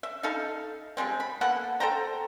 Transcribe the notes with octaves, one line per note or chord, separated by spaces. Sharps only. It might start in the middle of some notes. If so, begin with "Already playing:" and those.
E5
D#4 A4 E5 F5
F3 G3 G#3 C4
B5
A#3 B3 A4 F#5
A4 C5 G5 A#5